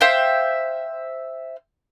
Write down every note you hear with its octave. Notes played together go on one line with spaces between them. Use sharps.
C5 E5 F5 G5